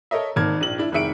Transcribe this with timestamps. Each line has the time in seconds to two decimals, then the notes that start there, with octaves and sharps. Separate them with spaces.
0.11 A4 A#4 C#5 D#5 E5
0.36 G#1 D#3 A#3 A5 F6 G#6
0.61 A#1 F#7
0.78 D4 E4
0.92 F1 D#3 G#4 E5 C#7 D7